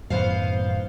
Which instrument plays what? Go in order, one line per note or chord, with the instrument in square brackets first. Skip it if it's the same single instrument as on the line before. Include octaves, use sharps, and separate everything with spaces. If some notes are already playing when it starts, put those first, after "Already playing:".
[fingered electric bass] F#2 A2 D#3 [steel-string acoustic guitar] B3 C5 F5